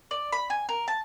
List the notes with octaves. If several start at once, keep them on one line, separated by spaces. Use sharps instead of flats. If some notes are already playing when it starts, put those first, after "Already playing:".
D5
B5
G#5
A#4
A5